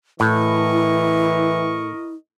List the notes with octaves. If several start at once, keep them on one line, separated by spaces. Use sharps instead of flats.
A2 E3 E4 A#4 D#5 C#6